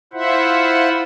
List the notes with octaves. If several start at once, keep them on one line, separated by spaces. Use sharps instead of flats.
E4 F4 C5 E5 F#5